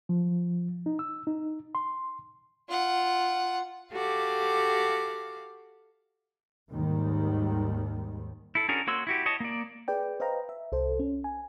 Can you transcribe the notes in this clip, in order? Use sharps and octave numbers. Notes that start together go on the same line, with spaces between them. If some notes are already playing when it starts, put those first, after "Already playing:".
F3
D#4
E6
D#4
C6
F4 F#5
F#4 G4 A4 F5 D6
D#2 G#2 D#3 G3
E4 A4
C#4 D4 F#4 G#4 A#4
A#3 F#4 C#5 C6 E6
E4 F#4 G4
C#5 D#5 A5
A#3 D5
G#4 B4 D5 G5
B4 C5 D#5 F5 G5 A#5
E5
C2 A4 C5
C#4
G#5